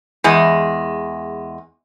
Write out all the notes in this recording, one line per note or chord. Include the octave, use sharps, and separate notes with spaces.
E2 G#3